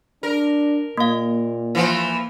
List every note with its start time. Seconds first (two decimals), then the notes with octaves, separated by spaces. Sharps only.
0.23 D4 A#4
0.97 A#2 A#3 F5
1.75 E3 F3